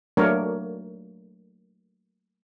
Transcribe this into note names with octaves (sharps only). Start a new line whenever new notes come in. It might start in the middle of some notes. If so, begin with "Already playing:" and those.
F#3 A3 A#3 D4 A#4 C#5